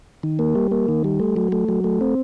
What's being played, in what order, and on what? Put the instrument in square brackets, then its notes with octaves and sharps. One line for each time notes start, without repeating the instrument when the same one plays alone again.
[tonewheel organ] D#3
A#3
G3
A#3
D#3
G3
A3
F#3
A3
F#3
A3
C4